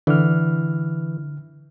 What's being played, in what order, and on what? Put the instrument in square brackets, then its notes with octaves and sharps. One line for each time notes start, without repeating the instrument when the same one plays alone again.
[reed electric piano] D3 F6 [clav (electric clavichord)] E3